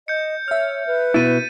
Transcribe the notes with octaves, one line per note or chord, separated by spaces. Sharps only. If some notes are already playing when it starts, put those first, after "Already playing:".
D#5 G6 C#7
C#5 E5 F6
B4
B2 E4 A6 B6 D#7